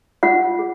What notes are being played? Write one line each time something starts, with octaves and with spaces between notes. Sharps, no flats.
F4 F#5
G#4